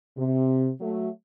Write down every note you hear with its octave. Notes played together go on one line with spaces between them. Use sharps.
C3
F#3 A3